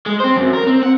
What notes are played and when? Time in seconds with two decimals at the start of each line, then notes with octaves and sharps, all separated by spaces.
0.06 G#3
0.20 C4 C5
0.37 F#2
0.54 A#4
0.67 C4
0.83 F#5